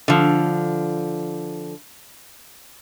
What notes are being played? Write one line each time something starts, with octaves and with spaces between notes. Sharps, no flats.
D3 F3